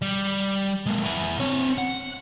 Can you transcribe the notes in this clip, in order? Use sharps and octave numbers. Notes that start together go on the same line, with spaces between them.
G3
G#3 A#3
E4 G#4
C4 C#5
F#5